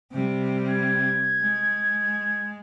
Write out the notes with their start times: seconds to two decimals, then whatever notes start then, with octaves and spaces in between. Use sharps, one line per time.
0.12 C3 G3
0.70 G#6
1.41 G#3